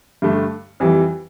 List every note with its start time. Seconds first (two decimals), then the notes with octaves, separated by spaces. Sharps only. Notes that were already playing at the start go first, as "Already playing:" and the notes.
0.22 G2 D3 A3
0.80 F2 E3 G3